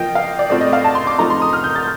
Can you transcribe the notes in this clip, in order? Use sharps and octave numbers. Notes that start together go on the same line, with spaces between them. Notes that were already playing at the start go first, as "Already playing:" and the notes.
Already playing: F3 A#3 F4 D#5 G5
F5
D5
A2 A3 C4 F4 D5
D#5
F5
A5
C6
D6
F3 A3 D#4 A#5
C6
D#6
F6
G6
A6